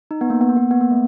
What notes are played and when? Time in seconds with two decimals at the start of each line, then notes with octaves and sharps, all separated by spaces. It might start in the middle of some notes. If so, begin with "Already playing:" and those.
0.11 D#4
0.21 B3
0.30 A#3
0.41 B3
0.49 A#3
0.57 B3
0.71 B3
0.81 A#3
0.91 A3